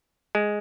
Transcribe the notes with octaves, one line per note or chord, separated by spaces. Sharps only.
G#3